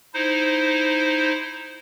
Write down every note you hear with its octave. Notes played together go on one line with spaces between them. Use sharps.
D#4 E4 C5